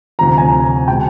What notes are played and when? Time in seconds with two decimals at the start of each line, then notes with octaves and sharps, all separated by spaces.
0.19 D2 C3 F3 A#5
0.38 G#5 A#5
0.88 B2 G#3 G5 A5